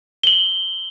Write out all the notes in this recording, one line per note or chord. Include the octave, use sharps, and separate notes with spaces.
F#7 G7